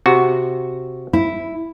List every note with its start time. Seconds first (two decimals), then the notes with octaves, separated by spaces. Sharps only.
0.06 C3 F#4
1.13 E4